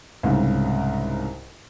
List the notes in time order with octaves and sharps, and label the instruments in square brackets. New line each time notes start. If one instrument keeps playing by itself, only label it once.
[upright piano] C2 G#2 C#3